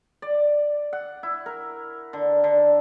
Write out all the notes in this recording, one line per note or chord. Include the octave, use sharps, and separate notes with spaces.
D5
F#5
E4
A#4
D3
D3